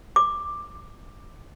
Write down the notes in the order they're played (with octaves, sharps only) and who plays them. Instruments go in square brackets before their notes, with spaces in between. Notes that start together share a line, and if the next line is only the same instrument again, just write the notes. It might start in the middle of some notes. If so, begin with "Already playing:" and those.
[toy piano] D6